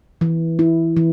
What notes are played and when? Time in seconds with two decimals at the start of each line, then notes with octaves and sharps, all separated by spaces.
0.21 E3
0.59 E4
0.97 E3